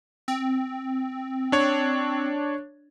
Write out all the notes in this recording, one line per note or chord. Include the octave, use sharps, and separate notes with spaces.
C4
D4 C#5